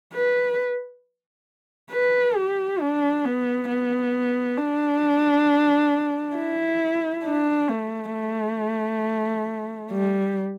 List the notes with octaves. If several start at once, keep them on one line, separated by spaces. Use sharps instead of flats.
B4
B4
G4
D4
B3
B3
D4
E4
D4
A3
A3
G3